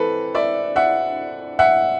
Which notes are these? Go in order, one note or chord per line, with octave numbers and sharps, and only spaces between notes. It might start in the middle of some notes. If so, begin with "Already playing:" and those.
Already playing: E3 C4 A4 B4
D5 E5
E5 F#5
E5 F#5